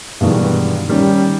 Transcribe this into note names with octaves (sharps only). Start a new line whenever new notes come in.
G2 B2 D#3 E3 G#3
D#3 G3 C#4